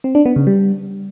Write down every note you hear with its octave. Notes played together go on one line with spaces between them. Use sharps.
C4
D4
B3
C#3
G3